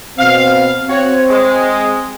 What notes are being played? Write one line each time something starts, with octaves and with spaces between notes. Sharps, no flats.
B2 C4 F5
C4 F#4 C#5
G#3